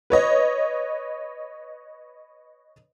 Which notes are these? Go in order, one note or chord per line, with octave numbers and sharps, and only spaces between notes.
B4 C#5 D#5